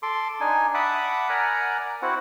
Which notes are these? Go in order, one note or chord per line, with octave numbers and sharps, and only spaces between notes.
A4 C6 D6
D4 D#4 G#5
E5 F#5 A5 B5 D6 D#6
A#4 D5 F#5 G#5 A#5
C4 E4 F#4 F#5